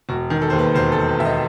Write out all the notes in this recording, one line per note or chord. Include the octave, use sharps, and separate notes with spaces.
E1 F#4
D#3
A4
C5
D#2
B4
E1 C5
A4
E1
B4
E1 E5
D#5